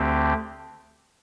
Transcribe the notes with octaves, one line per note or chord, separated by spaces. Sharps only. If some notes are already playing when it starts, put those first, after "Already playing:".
Already playing: D2 D3 A3 C4 G4